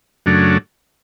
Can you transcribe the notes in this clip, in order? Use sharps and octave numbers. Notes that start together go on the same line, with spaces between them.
F#2 C#3 F#3 A3 D4